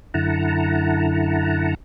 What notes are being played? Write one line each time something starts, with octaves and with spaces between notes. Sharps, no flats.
F#2 D3 E4 F#5 A5 A#5